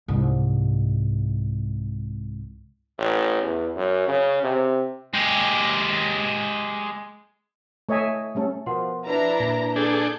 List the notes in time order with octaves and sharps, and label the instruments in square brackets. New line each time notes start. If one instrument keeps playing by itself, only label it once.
[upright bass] C2 G#2
[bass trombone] A1
E2
F#2
C#3
C3
[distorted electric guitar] G#3 G4
[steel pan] A3 C#5 D#5 E5 G#5
G3 A3 C#4 A4
[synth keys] B2 F3 [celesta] A#4 F#5 C6
[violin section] D4 E4 A#5 [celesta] B4
[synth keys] A#2
[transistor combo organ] D4 G#4 A4 [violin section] G6